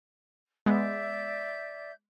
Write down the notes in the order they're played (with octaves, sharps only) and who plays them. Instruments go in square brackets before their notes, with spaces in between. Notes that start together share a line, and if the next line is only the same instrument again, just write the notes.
[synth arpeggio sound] G#3 B3 [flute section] D5 E5 G6